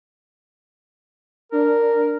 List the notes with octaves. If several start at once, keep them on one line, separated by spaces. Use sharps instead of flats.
D4 A#4